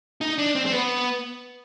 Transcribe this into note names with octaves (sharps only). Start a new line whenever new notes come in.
D#4
D4
C4
C4
B3